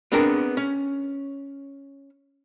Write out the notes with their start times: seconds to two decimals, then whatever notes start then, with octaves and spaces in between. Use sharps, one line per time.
0.12 B3 C4 D4 G#4 A#4
0.57 C#4